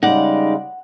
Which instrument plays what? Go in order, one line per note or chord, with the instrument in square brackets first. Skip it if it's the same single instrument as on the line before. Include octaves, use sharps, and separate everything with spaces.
[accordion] C#3 G3 G#3 [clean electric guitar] D#4 D5 [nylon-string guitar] F#5